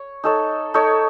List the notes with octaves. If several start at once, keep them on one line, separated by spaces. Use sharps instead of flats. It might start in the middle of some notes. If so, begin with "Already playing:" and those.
Already playing: C#5
D#4 A4 C#5
D#4 A4 C#5